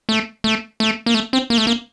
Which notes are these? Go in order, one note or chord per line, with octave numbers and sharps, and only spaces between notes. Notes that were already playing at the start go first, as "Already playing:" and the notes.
A3
A3
A3
A#3
A3
C4
A#3
A3
A#3